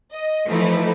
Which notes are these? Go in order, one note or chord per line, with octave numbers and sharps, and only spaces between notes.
D#5
E3 F3 A3 D#4 E4